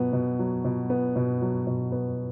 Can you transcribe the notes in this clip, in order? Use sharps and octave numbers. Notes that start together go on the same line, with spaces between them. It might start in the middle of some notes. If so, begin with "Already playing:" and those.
Already playing: B2 F#3 B3
B2
F#3
B2
B3
B2
F#3
B2
B3